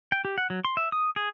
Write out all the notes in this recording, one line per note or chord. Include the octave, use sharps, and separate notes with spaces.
G5
G4
F#5
F#3
C6
E5
D#6
G#4